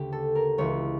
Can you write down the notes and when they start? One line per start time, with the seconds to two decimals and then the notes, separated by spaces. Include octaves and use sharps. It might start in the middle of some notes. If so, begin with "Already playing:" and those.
Already playing: D2 C#3 G4
0.12 A4
0.35 A#4
0.58 C#2 C#3 E3 C#5